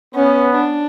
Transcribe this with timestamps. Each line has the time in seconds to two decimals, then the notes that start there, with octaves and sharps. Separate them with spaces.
0.15 B3 C#4
0.56 D4